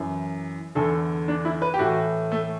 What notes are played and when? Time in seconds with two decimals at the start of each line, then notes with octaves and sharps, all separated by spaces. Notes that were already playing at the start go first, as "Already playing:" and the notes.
Already playing: F#2 E3
0.75 E2 D3 A4
1.28 D4
1.45 E4
1.62 B4
1.74 G4
1.79 A2 E3 F#4
2.32 A3